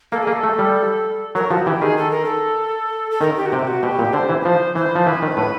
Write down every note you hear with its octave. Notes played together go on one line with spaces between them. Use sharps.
A#3 A4
A#3 G#4
A4
A3
G3
F#3 A#4
F3 F#4
E3 G4
D#3 G#4
A4
A#4
A4
A4
D#3 A#4
G4
F#4
C3 G4
F#4
B2 G4
A#2
D3 C5
E3
B4
F3 C5
E3 C5
F3
E3 B4
D#3
A2